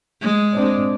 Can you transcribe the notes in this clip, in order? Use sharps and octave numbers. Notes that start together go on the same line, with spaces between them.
G#3
C4 D4